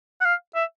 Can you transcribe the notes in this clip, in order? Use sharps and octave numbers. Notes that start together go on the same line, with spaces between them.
F#5
F5
E5